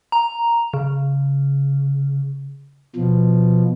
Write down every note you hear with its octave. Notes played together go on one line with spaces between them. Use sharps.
A#5
C#3
B2 F3